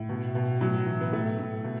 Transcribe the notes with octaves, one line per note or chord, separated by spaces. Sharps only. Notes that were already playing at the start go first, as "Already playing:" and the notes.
Already playing: A2
B2
B2
A2 F#3
E3
B3
A2 A3
A2
B2